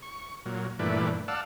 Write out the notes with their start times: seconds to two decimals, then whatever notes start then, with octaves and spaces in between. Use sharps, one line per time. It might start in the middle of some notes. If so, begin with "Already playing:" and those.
0.03 C#6
0.46 A#2 F#3
0.79 G2 A#2 E3 A3 B4 D5
1.28 D5 F5 F#5 A5 E6